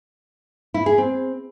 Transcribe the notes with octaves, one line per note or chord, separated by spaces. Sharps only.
E4
G#4
C4